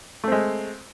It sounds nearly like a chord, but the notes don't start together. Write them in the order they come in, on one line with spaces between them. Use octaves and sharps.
A3 C4 G#3